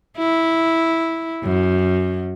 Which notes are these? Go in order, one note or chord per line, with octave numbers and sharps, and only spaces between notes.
E4
F#2